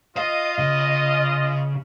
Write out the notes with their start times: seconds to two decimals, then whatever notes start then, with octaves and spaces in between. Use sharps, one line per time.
0.17 F4 D#5 F5
0.58 C#3